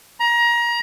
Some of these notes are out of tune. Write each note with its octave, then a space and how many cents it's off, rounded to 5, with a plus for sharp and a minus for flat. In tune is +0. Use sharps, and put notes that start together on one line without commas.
A#5 +25